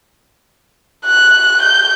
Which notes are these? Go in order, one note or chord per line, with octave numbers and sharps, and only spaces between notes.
F#6
G6